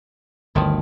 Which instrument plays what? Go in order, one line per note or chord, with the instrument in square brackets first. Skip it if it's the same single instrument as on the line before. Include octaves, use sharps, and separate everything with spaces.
[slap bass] G1 D2 [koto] D#3 F3 E4